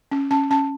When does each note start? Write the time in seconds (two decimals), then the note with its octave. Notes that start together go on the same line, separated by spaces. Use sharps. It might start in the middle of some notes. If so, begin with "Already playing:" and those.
0.12 C#4
0.31 C#4 A5
0.51 C#4 A5